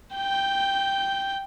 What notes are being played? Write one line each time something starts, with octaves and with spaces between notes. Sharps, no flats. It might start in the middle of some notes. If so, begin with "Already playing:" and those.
G5 G6